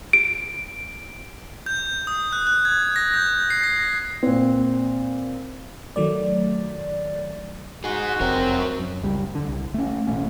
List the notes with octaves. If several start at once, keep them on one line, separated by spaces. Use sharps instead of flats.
D7
G6
D#6
F#6
F#6
G#6
A#6
G6
C7
A#6
A#2 C4
D#3 F#3 A3 D5
D#4 F#4 G#4
F1 F#3 C4 A#4
F#2
F#1 C#2 G3
D3
C2
A3 C#4
A1 B2 A3 C#4